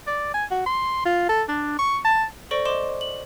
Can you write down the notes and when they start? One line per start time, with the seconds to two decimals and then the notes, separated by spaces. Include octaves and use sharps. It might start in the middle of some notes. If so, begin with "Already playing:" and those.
0.08 D5
0.34 G#5
0.51 F#4
0.66 C6
1.05 F4
1.29 A4
1.49 D4
1.79 C#6
2.05 A5
2.51 A4 C5 D5 C#6 A#6 D7
2.65 C5 D#5 C6 D6 E7
3.01 F#7